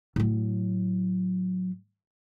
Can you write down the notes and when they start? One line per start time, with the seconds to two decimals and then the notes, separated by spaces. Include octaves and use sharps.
0.16 A2 F#3